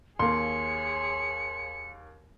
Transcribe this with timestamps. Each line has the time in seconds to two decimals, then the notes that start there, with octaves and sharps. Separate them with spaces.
0.19 D#2 A#3 G#4 C#5 C6 C#7